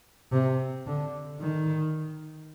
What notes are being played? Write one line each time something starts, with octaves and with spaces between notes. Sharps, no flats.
C3
D3
D#3